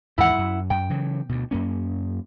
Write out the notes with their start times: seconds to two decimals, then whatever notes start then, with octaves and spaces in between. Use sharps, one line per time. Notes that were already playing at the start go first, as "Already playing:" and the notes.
0.18 D#2 G#2 E3 E4 F#5
0.38 F#2
0.70 F#2 G5
0.90 C#3 E3 F#3
1.29 D2 B2
1.51 F#2 A#3 C#4